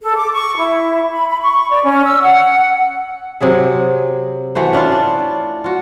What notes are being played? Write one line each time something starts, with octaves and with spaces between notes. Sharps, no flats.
A4
D6
C#6
E4
B5
B5
C#6
D5
C#4
E6
F#5
C3 F#3 G#4 E5
E3 A3 F#4 C5
C#4 D4 E4 F4
D4
F4 F#4